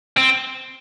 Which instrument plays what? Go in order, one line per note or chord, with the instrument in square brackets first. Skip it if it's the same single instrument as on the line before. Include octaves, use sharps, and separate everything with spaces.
[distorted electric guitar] C4